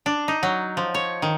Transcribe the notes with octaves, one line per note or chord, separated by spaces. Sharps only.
D4
D#4
F#3
F3
C#5
D#3